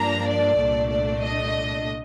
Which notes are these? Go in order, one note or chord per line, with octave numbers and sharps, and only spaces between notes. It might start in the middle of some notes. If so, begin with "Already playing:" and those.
Already playing: G2 F3 A#3 D4 A#5
D5
C2 A#2 A3 D4
D5
D#5